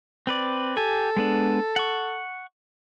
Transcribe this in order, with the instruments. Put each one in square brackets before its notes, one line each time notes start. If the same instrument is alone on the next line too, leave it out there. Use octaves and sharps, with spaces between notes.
[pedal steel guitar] C4 B4 D5
[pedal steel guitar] G4 G#5 [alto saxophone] A4
[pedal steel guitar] G#3 B3 D4
F#5 C#6